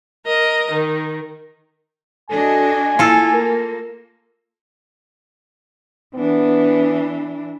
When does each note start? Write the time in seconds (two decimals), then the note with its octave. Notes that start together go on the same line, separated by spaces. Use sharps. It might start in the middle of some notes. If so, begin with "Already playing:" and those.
0.26 A#4 D#5
0.71 D#3
2.31 D4 F#4 A4 D#5 G#5
2.99 A#3 E4 F4 A4
3.34 A#4
6.15 E3 B3 D4